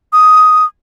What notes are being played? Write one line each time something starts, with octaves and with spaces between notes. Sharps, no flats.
D#6